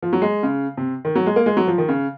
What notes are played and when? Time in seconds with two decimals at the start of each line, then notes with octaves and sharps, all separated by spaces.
0.03 F3
0.13 F#3
0.22 G#3
0.43 C#3
0.77 C3
1.05 D#3
1.15 F#3
1.26 G#3
1.36 A#3
1.46 G#3
1.57 F#3
1.67 F3
1.78 D#3
1.89 C#3